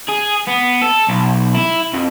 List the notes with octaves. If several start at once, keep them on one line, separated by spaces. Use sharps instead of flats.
G#4
B3
A4
B1
E4
F2